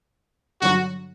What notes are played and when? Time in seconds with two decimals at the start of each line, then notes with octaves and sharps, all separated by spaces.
0.61 G2 D3 F#3 F#4